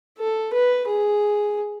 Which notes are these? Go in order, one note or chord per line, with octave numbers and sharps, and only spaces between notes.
A4
B4
G#4